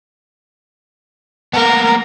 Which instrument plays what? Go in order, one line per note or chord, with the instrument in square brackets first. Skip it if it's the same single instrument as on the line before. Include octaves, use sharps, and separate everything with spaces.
[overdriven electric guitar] A#3 B3 [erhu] A#4